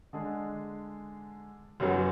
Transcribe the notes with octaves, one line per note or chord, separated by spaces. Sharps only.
D3 G#3 D4 G#4
F#1 F#2 C#3 F#3 B3